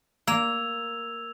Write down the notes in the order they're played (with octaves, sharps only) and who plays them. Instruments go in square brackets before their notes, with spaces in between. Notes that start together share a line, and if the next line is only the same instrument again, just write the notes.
[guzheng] A#3 [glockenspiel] E6 G#6 F7